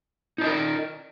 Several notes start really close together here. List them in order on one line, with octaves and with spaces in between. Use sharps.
D#4 D5 D#5 A#4